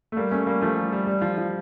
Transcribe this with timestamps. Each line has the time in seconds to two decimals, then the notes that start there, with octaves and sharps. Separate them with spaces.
0.12 A3
0.17 G3 A#3
0.31 A3 C#4
0.46 G3 A#3
0.61 F3 A3
0.77 G3
0.92 G3
1.07 G3
1.22 F3
1.38 F3